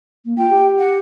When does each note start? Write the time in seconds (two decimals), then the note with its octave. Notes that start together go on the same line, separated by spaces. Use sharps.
0.25 A#3
0.38 F4 G5
0.50 G4
0.79 F#5